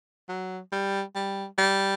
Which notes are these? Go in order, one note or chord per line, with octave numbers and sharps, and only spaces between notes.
F#3
G3
G3
G3